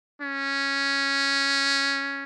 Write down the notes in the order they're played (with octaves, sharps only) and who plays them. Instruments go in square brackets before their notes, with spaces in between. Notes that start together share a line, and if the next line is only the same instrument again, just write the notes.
[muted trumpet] C#4